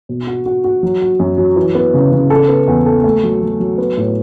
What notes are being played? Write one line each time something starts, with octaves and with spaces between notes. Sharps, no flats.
B2
F#4
F#4
F#4
F#3
F#4
F#2
F#3
E3
B3
C#3
C#3
A4
B3
E2
A4
A3
F#3
F#3
F#3
B3
A2